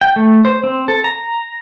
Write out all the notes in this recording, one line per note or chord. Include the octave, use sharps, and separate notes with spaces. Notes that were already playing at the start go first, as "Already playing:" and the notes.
G5
A3
C5
C4
A4
A#5